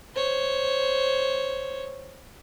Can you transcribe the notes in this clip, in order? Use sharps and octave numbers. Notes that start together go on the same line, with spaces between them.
C5 C#5